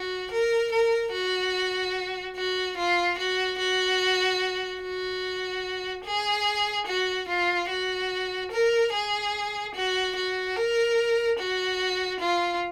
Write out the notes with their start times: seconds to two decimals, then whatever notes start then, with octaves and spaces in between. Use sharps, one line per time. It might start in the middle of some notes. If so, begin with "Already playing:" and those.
Already playing: F#4
0.31 A#4
0.72 A#4
1.13 F#4
2.36 F#4
2.77 F4
3.18 F#4
3.59 F#4
4.82 F#4
6.05 G#4
6.87 F#4
7.28 F4
7.70 F#4
8.51 A#4
8.92 G#4
9.75 F#4
10.16 F#4
10.56 A#4
11.39 F#4
12.20 F4